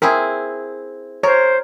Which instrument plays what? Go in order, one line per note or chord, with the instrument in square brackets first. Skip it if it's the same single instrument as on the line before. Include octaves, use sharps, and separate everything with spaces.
[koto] C4 E4 G#4 [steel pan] A#4
[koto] A#4 [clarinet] C5 [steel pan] C#5